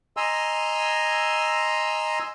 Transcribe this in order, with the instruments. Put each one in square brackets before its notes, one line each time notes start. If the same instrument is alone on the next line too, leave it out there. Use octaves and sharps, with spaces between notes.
[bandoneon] D#5 G#5 A#5 C6 E6